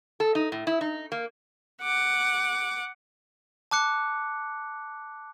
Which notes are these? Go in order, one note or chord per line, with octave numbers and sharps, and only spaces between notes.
A4
D#4
A2
E4
D#4
A#3
F#5 D6
A5 D6 F#6 C#7